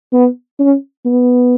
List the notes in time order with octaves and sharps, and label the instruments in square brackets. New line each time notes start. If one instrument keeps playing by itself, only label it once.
[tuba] B3
C#4
B3